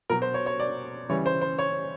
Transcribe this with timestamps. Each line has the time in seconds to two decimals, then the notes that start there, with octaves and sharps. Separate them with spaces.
0.10 B2 F#3 A#4
0.22 C5
0.34 C#5
0.46 C#5
0.60 D5
1.09 C#3 E3 G3 C#5
1.26 C5
1.41 C5
1.59 C#5